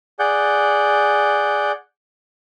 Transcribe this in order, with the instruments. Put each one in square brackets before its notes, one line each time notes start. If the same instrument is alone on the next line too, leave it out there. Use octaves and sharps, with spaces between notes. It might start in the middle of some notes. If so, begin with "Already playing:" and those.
[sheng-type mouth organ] G#4 D5 F#5 G6